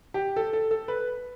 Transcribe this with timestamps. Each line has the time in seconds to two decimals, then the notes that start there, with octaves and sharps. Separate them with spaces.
0.14 G4
0.36 A4
0.53 A4
0.71 A4
0.88 B4